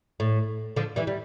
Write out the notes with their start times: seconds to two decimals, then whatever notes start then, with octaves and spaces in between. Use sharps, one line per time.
0.20 A2
0.76 D3 F3
0.96 E3 G3
1.07 G3